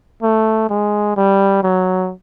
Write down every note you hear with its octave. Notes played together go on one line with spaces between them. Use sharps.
A3
G#3
G3
F#3